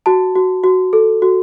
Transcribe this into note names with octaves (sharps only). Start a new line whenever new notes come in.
F#4 A5
F#4
F#4
A4
F#4